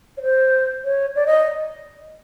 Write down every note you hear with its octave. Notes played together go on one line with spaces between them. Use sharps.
C#5
C5
C#5
D5
D#5